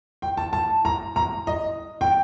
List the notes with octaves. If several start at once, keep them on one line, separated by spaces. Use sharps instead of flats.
G5
A5
A5
A#5
A#5
D#5
G5